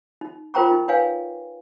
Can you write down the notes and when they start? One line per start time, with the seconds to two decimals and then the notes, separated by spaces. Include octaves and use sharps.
0.21 D#4
0.54 F4 A#4 C5 G5 A#5 C#6
0.72 D#4
0.88 D#4 B4 C#5 F5 G#5